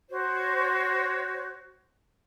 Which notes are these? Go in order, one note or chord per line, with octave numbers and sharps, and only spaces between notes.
F#4 C5 C#5